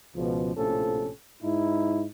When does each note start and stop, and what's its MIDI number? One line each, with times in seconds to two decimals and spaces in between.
0.16 0.55 37
0.16 0.55 47
0.16 0.55 53
0.56 1.10 34
0.56 1.10 45
0.56 1.10 48
0.56 1.10 53
0.56 1.10 61
0.56 1.10 69
1.43 2.06 44
1.43 2.06 63
1.43 2.06 64